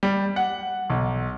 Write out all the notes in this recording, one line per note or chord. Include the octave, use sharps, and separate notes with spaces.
G3
F#5
B1